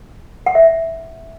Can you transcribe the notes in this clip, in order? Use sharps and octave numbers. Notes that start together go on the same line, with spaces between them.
F#5
E5